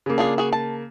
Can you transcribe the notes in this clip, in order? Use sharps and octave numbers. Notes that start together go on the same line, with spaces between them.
C#3 A#3
D4 F4 G#4
F#4 G#4
A5